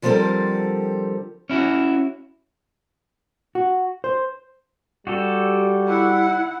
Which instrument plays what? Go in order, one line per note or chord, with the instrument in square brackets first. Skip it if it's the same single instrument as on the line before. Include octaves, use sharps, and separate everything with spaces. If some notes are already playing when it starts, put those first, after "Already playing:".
[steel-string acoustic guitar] D3 F3 G3 C4 A4 A#4
[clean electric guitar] C#4 E4 F#4
[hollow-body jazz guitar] F#4
C5
[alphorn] G3 [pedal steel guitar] F#4 G4 A4
[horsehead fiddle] E4 F#5